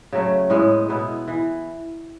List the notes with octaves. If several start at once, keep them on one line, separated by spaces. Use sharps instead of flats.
C#3 F#3 A3
A2 G#3 B3
B2 G#3 B3 E4
E3